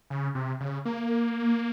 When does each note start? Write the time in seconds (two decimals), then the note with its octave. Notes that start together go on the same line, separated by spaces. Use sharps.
0.10 C#3
0.35 C3
0.60 C#3
0.85 A#3